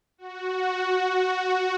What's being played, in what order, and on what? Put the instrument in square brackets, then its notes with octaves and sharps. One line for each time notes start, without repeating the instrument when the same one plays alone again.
[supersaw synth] F#4